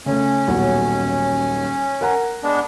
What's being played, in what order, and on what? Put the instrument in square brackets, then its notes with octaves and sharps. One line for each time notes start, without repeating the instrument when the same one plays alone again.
[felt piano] C#3 A3 [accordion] C#4
[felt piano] D#1 B1 F#3
A#4 F#5 A#5
[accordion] G#3 B3 D4